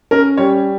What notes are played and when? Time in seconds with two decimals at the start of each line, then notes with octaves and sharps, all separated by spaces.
0.11 C#4 A#4
0.37 G3 C#5